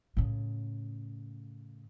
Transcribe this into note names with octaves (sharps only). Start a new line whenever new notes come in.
A2 C#3